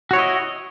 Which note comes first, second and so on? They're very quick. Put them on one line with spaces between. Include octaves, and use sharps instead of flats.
F#4 C#5 E4 D#5